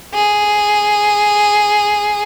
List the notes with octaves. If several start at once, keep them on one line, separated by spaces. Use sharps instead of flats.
G#4